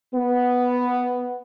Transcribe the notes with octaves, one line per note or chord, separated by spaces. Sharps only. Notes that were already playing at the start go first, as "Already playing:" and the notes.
B3